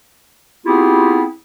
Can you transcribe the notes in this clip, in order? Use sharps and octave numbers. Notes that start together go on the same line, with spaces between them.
B3 C4 E4 F4 G4 G#4